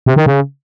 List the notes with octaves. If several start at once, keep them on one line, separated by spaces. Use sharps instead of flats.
C3
D#3
C#3